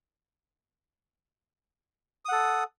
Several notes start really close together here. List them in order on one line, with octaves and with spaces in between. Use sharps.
D#6 F#5 A4